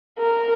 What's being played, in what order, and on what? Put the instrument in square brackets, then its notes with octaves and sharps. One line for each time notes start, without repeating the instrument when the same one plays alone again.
[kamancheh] A#4